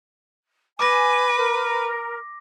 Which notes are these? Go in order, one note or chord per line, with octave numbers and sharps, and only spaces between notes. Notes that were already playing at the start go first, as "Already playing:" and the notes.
B4 G#5 D6 A#6
A#4